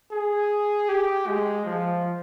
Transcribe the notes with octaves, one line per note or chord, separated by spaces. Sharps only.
G#4
G4
G#3
F3